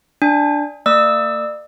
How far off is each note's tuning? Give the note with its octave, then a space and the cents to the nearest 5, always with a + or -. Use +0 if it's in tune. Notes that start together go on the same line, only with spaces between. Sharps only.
D4 +0 G#5 -25
A#3 -45 D5 +35 E6 -10